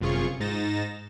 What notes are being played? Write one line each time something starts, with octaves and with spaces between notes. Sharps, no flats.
G1 F#2 C3 F4 G#4 C#6
G#2 D#4 A6 A#6 E7